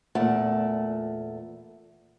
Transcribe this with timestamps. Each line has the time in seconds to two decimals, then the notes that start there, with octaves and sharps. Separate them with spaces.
0.15 E2 A#2 A3 F#5